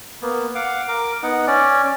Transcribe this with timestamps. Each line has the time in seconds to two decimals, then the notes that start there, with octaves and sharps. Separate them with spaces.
0.22 A#3 B3
0.55 F5 F#5 D6
0.88 A#4 D6
1.23 B3 D#4 F#5
1.47 C#4 D5